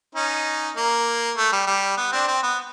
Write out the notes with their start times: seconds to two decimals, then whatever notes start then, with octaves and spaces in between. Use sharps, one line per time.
0.15 C#4 D#4
0.76 A#3
1.37 A3
1.52 G3
1.67 G3
1.97 B3
2.12 C4 D4
2.28 C4
2.43 B3